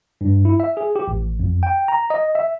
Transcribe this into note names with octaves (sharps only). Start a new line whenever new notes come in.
G2
E4
E5
G#4
G4
A1
F2
G5
A#5
D#5
E5